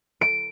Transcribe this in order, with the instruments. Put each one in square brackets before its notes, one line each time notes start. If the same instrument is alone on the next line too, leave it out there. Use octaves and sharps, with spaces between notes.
[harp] D7